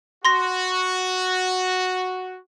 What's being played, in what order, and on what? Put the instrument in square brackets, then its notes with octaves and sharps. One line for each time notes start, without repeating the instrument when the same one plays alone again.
[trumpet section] F#4 [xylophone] C6 A#6